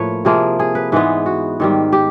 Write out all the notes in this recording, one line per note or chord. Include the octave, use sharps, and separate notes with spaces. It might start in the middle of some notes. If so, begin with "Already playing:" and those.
Already playing: A2 F3 A#3 B4 C#5
C3 F3 A#3 G#4
G#4
B4
G#2 E3 G#3 B3 B4
F#4
G#2 D#3 G3
G4